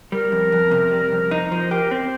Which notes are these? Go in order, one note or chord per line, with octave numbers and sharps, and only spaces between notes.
G3 A#4
F2
F2
C3
G3
F2
D#4 C5
F3 C5
G4 A#4
C4 C5